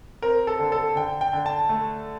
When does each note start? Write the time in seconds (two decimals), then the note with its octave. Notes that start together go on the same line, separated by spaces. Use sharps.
0.22 C4 A#4
0.47 A4
0.60 D3
0.72 A4
0.96 D3 G5
1.21 G5
1.33 D3
1.46 A5
1.69 A3